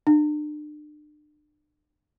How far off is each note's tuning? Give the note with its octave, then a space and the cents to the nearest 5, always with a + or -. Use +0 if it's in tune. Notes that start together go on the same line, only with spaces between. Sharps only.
D4 +35